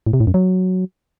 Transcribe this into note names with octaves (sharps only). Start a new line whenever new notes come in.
A2
C3
A2
F#2
F#3